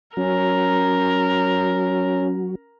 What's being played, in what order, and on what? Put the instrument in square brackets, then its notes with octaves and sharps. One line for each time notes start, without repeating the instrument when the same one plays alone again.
[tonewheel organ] F#3 [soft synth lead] C#4 [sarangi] A#4